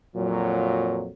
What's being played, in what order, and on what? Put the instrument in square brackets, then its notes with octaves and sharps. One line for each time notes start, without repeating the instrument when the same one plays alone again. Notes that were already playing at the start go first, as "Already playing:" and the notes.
[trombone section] F2 A#2 F#3